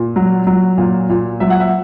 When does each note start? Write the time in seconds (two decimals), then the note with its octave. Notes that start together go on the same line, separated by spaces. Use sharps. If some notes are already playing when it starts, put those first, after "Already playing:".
Already playing: A#2
0.16 F#3
0.47 F#3
0.78 A#2
1.09 A#2
1.40 F#3 E5
1.50 F#5
1.60 E5